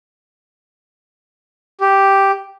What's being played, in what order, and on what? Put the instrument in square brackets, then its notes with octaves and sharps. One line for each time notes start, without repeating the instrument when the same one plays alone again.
[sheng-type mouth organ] G4